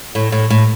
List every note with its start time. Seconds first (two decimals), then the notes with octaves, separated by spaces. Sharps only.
0.15 A2
0.32 A2
0.50 A2